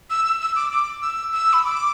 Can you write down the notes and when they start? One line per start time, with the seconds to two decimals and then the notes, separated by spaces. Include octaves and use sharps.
0.10 E6
0.25 E6
0.40 E6
0.55 D6
0.72 D6
1.01 E6
1.33 E6
1.53 B5
1.64 D6